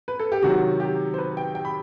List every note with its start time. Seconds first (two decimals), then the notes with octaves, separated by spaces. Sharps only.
0.08 B4
0.19 A4
0.32 G4
0.42 C3 D#3 F#3 F#4
0.80 G4
1.14 C5
1.18 B4
1.37 G5
1.55 G5
1.65 B5